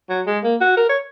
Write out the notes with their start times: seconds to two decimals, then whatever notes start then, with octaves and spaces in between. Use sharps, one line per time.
0.10 F#3
0.27 G#3
0.44 A#3
0.61 F#4
0.77 A#4
0.89 C#5